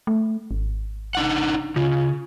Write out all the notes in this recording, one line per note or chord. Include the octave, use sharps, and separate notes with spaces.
A3
G#1
D4 D#4 F#5
C#3 F4